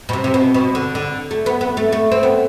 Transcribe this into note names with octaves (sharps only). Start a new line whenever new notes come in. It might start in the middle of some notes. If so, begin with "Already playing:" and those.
B2
C3
C3
B2
B2
D3
D3
A3
B3
B3
A3
A3
C4
B3